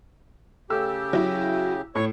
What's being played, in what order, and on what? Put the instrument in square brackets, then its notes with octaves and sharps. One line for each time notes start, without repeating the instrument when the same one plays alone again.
[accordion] C#3 G4 [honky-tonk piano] A3 E6
[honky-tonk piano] F#3 E4
[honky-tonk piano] A2 [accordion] C#5 C#6